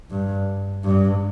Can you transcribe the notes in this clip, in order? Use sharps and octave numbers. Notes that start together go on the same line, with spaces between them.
G2
G2